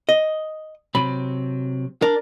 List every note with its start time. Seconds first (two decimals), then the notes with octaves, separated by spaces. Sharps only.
0.09 D#5
0.95 C3 F#3 C4 B5
2.02 D4 A#4